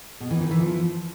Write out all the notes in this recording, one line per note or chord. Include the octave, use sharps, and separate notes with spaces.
B2
E3
D#3
E3
F3